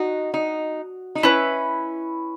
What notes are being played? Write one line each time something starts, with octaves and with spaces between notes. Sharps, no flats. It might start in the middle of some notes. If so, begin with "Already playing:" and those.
Already playing: D#4 F#4
D#4
D#4
C#4 E4 B4